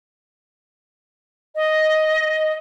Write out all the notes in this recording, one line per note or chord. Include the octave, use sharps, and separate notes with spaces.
D#5